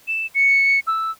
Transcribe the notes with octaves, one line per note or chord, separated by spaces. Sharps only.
E7
C#7
E6